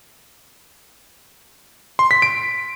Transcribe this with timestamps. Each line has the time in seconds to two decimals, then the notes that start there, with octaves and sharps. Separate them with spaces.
1.99 C6
2.11 B6
2.22 D7